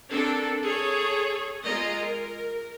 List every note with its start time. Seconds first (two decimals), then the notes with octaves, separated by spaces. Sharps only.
0.11 C4 D4 A4 A#4
0.64 G#4 A4 C#5
1.65 G#3 F4 D#5 A#5
2.06 A#4